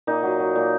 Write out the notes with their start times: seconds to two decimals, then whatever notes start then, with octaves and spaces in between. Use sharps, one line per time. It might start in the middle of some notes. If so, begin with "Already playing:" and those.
0.07 A#2 D#4
0.23 F#3
0.40 F#3
0.56 A#2